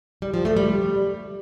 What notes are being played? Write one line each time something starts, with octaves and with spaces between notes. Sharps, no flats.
G3
F3
A3
G3